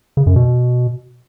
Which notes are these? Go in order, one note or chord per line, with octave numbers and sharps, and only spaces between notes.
C#3
F#2
B2